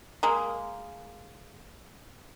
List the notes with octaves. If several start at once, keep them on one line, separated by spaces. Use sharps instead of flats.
G#3 A#3